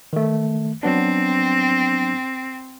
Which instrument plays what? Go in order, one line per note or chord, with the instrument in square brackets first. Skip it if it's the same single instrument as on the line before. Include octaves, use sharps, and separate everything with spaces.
[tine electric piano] D#3 A3
[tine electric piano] F#3 B3 D4 [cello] C4